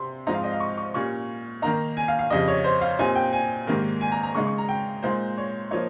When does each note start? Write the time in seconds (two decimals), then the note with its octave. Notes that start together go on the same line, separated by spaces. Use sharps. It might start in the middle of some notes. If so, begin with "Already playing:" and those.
Already playing: C3 C4 C6
0.27 G#2 F3 G#3 C4 D#4 A#5
0.35 F5
0.44 D#5
0.52 F5
0.60 C#6
0.78 C#6
0.94 A#2 G3 C#4 C#6
1.62 D#3 A#3 D#4 A#5
1.97 G#5
2.08 F5
2.19 F5
2.30 F2 C#3 G3 D#5
2.48 C#5
2.64 C5
2.81 F5
2.99 A#2 G3 C4 D#4 G#5
3.15 G5
3.33 G#5
3.67 G#2 D#3 G3 A#3
4.01 G#5
4.12 A#5
4.23 A#5
4.35 C#3 G#3 D#4 C#6
4.47 C#6
4.58 A#5
4.69 G5
5.03 A#2 G#3 D#4 C5
5.38 C#5
5.71 F3 A#3 D#4 C#5